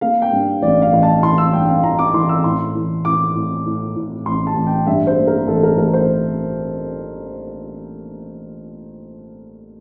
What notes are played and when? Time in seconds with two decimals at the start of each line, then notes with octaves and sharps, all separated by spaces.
0.01 A#3 F5
0.22 G5
0.32 G2
0.62 A1 D5
0.82 F5
0.93 A1
1.03 A5
1.23 E3 C6
1.38 E6
1.53 G2 G5
1.68 F5
1.83 E3 A#5
1.99 D6
2.14 E3 C6
2.29 E6
2.44 A2 C6
2.75 E3
3.05 A2 D6
3.35 A2
3.66 A2
3.96 A2
4.26 A1 C6
4.47 A5
4.57 A1
4.67 G5
4.87 G2 E5
5.07 C5
5.17 A#3
5.27 A#4
5.47 A1 A4
5.63 A#4
5.78 A1 A#4
5.93 C5